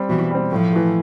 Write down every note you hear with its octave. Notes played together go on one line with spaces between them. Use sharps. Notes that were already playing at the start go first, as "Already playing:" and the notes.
Already playing: G3 C4
B2 E3
G3 C4
A2 F3
E3 A3